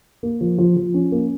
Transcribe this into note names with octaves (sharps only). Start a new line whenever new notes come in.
A#3
F3
F3
F3
C#4
A#3